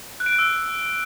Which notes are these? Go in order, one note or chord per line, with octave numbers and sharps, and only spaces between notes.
F#6
D7
F#6
E6